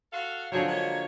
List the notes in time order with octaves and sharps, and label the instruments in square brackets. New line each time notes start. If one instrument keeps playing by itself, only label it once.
[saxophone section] F#4 A4 F5
[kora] D3 F3 F#3 [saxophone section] C4 G#4 C#5
[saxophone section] A#2 G#3 C#5